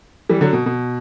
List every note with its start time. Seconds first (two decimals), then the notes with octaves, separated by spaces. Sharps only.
0.29 E3 G3
0.41 D3 F#3
0.53 B2
0.66 B2